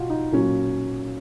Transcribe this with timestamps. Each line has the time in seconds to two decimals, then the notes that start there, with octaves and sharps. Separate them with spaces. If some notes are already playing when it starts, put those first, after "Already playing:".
Already playing: B2 F4 F#4
0.10 D#4
0.32 A#2 F#3 C#4